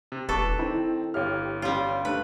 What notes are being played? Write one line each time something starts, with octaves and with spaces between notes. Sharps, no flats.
C3
E1 G3 A4 B4 C#6 D6
D#3 C4 E4
G1 G4 C#5 F5 F6
G3 C#4 F4 G4
D2 G2 A3 B4